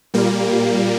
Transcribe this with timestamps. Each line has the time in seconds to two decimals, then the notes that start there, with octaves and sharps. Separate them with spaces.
0.14 A#2 G3 A#3